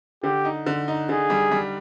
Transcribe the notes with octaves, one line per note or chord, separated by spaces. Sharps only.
D3 G4
D#4
D3
D#4
D3 G#4
G3
G3